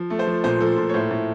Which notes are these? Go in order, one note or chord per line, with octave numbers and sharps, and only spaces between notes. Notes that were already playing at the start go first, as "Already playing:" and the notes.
Already playing: F3
A3
C5
F3
A#2 C5
F3 A4
A#2
C#5
A2 C5
A2